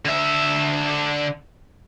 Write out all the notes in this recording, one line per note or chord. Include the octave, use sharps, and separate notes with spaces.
D3 E5